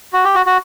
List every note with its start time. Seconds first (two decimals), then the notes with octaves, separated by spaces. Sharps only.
0.13 F#4
0.24 G4
0.35 F#4
0.46 F#4